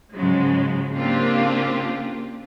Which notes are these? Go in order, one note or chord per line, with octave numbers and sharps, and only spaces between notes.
G#2 C#3 F3 F#3 G#3
C#3 A#3 C4 D4 F4 G4